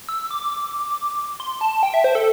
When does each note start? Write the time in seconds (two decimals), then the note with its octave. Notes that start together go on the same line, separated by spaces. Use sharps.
0.09 E6
0.30 D6
1.40 C6
1.61 A5
1.83 G5
1.94 E5
2.04 C5
2.15 A4